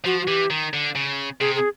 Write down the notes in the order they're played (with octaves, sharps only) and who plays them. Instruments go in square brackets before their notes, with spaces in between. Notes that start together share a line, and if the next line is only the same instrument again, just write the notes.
[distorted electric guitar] F3 [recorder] F#4
[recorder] F#4
[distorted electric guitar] E3 [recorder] G4
[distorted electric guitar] D#3
D3
C#3
[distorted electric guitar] C3 [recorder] G#4
[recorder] G#4